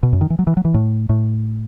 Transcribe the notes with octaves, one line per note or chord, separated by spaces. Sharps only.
B2
F#2
D#3
E3
F#3
E3
F#3
E3
A2
A2